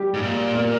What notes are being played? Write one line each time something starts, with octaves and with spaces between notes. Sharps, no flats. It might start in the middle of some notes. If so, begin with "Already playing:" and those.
Already playing: G3 G4
G#2
A#2
A#3 A#4